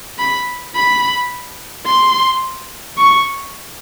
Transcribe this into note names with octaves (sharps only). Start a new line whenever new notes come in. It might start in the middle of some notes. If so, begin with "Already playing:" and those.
B5
B5
C6
C#6